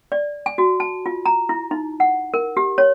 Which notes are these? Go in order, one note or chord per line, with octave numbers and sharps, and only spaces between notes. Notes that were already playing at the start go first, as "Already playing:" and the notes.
D5
G#5
F#4
A5
F4
A#5
E4
D#4
F#5
A#4
G4
C#5